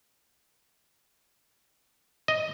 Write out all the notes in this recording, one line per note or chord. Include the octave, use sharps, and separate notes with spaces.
D#5